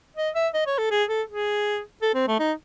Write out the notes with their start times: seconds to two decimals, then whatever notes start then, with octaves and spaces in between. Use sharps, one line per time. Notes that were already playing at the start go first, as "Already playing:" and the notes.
0.17 D#5
0.35 E5
0.54 D#5
0.67 C#5
0.78 A4
0.91 G#4
1.09 A4
1.28 G#4
2.02 A4
2.15 C4
2.28 A3
2.39 D#4